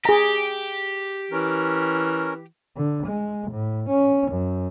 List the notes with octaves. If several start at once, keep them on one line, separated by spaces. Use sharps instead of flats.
G4 G#4 A#5
E3 C#4 A#4
D3
G#3
A2
C#4
F#2